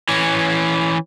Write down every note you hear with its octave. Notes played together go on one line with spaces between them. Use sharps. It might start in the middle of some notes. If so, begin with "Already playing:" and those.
E3 C#4